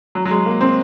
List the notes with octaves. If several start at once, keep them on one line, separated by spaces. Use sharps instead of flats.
F#3
F#3
G#3
A#3
C4